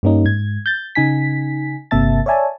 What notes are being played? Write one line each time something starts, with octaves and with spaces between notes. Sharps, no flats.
G2 G3 A#3 C#4 D#4
G#2 G#6
G6 A6
C#3 D#4 G#5 B6
G1 C3 A#3 E5 A5 A6
C#5 D5 E5 G#5 A5